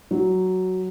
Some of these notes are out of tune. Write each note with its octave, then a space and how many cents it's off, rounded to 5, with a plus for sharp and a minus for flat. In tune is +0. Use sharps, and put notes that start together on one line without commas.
F#3 +5